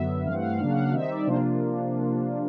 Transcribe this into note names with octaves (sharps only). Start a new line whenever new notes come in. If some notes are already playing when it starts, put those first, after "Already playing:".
Already playing: F#2 D3 F#3 B3 E5
G2 E3 A3 C4 F5
F#5
F5
C#3 F#3 A#3 D4 F5
F#5
F5
D#3 G3 C4 D#4 E5
D5
C3 F3 A#3 D4 F4 C5